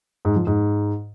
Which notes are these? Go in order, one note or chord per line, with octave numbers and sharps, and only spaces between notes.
G#2
F3
G#2